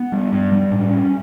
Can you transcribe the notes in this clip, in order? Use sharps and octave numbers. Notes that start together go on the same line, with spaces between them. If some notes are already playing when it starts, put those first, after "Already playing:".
Already playing: B3
G3
G2
G3
A2
C#4